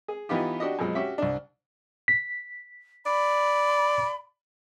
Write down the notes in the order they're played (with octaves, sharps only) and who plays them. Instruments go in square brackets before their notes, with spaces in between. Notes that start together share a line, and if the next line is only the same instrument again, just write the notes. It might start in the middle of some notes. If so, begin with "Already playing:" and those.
[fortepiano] G#4
E3 B3 D#4 F4 G4
D4 F#4 G4 D#5
F#2 B2 F3 G#3
C#4 F#4 G4 E5
C2 D4
[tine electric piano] B6
[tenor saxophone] D5 [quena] B5